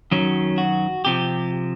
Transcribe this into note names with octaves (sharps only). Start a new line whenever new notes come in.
F#2 D#3 F#3 C#4
F#4
C3 F3 G4